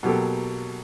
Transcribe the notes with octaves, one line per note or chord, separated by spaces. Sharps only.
B2 F#3 A#3 G4 A4